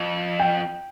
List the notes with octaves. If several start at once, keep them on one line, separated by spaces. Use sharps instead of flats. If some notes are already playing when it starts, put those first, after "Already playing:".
Already playing: F2
G5